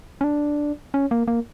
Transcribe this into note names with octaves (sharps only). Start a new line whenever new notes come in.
C#4
D4
C#4
A#3
A#3